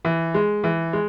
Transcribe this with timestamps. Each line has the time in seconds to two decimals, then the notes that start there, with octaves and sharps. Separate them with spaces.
0.05 E3
0.34 G#3
0.64 E3
0.93 G#3